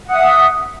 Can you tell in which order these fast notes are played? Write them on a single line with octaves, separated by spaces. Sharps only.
F#5 D#6 E5